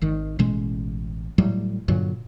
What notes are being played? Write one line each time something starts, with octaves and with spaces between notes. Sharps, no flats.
G#1 D#3
A1 B2 G#3 C#4
A2 F#3 G3
G2 A#2 D3 F#3